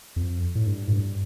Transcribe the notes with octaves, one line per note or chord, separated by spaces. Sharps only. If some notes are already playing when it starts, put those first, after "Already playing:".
F2
A2
G2
A2
G2